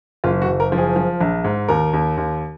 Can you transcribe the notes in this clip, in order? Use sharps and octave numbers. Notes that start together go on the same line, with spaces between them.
F#1 F4
F#4
F#1
A#4
F3
G#4
F3
A#1
G#2
D#2 A#4
D#2
D#2